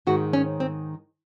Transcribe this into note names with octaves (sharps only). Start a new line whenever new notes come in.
G#2 D#3 G#3 F#4
C#4
C4